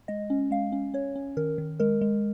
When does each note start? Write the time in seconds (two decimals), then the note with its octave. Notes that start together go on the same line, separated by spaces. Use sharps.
0.08 G#3 D#5
0.30 C#4
0.51 G#3 F5
0.72 C#4
0.94 C#4 C#5
1.16 C#4
1.37 D#3 A#4
1.58 D#3
1.80 G#3 A#4
2.01 G#3